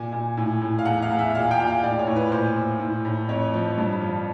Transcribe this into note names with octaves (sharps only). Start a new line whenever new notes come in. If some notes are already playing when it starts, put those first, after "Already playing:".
Already playing: A#2 G#5
A#2
A2
A2
F5
E2 F#5
F5
E2
E5
A#2 F5
G5
A#2
F5
A2 D5
C#5
A2
B4
A#2 C5
A#2
A2
A2
F2 C#5
F3
G2
F3